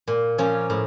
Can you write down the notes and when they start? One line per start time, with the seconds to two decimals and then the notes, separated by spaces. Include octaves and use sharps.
0.08 A#2
0.38 F3 A#3 C#4
0.70 A2